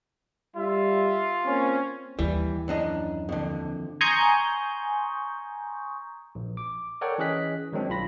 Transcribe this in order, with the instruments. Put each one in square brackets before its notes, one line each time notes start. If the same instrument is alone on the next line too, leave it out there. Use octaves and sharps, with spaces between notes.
[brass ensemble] G3 E5 [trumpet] F4
[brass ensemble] A#3 C4 C#4
[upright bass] D#2 [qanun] E3 [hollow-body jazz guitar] G3
[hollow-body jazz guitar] F#2 D4 D#5
F2 D3
[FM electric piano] G#5 A#5 C6 C#6 D#6 G6
[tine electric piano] A#1
D6
A4 A#4 C#5 D5 F#5 G5
E3 C#4 G#4 D#5 F#6 B6
D#3 F#3 G#3 C4 D4
B1 F4 B5 A#6